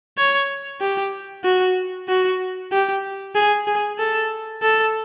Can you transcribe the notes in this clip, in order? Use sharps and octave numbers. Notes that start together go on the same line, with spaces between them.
C#5
G4
F#4
F#4
G4
G#4
G#4
A4
A4